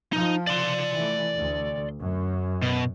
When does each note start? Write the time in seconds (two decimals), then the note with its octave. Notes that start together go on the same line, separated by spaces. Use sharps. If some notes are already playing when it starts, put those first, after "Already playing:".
0.13 F3 D#4
0.47 D5 C6
0.92 E3 A3
1.34 D2
1.99 F#2
2.62 B2